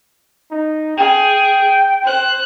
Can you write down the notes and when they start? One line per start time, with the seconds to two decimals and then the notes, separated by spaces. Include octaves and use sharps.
0.51 D#4
0.97 G#4 G5
2.04 C5 F#6